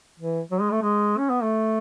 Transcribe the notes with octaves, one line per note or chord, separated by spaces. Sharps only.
E3
F#3
G#3
A3
G#3
C#4
B3
A3